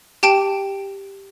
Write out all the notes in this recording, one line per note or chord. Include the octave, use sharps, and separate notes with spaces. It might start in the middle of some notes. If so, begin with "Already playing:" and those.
G4 G5 A5 D7